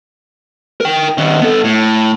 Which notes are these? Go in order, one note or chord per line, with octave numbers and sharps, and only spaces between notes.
A#4 G5
D#3 C#4
B3 A4
A2